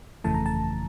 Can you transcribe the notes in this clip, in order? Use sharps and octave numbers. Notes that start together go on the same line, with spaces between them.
G1 F2 C#3 E3 A3 A5
A#5
A5